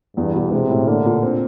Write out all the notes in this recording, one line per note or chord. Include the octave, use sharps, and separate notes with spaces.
E2 G2
B2
C3 G#3
A2
D3 A#3
A#2
C4